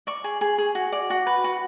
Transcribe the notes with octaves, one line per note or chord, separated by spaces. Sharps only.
D5 C#6
G#4
G#4
G#4
F#4
D5
F#4
B4
F#4